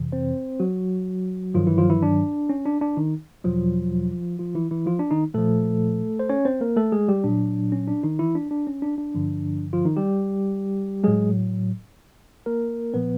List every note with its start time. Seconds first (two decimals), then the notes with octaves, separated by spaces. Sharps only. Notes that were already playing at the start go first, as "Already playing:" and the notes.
Already playing: F2 C3 E3
0.12 C4 C5
0.60 F#3 F#4
1.54 G2 D#3 F3 F#3 F4
1.67 E3 E4
1.78 F3 F4
1.90 E3 E4
2.03 D4
2.49 C#4
2.66 D4
2.81 D4
2.97 D#3 D#4
3.44 E2 B2 F3 F#3 F4
4.39 F3 F4
4.55 E3 E4
4.71 E3 E4
4.86 F3 F4
4.99 D4
5.11 D#3 D#4
5.34 A#2 F3 A3 A4
6.19 C5
6.29 C#4 C#5
6.45 C4 C5
6.61 A#3 A#4
6.77 A3 A4
6.92 G#3 G#4
7.08 G3 G4
7.24 A#2 F#3 D4
7.72 C#4
7.88 D4
8.03 D#3 D#4
8.19 E3 E4
8.35 D4
8.51 D4
8.67 C#4
8.82 D4
8.98 D4
9.14 G2 D3 F3
9.73 F3 F4
9.85 D#3 D#4
9.97 G3 G4
11.04 A2 F#3 G#3 G#4
12.46 A#3 A#4
12.94 A#2 F3 B3 B4